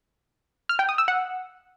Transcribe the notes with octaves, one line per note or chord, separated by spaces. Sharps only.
F6
G5
D#6
E6
F#5